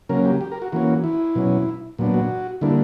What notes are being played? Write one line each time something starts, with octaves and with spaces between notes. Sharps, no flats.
C#3 F#3 A#3 C#4 A#4
G4
G4
A#4
F#4
E3 A#3 C#4 F#4
E4
B2 F#3 C#4
A#2 F#3 B3 D4
F#4
D3 G3 A#3 D4 E4